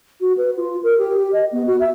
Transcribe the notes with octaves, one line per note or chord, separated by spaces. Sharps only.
F#4
B4
F4
A#4
G4
G4
D#5
B3
F#4
E5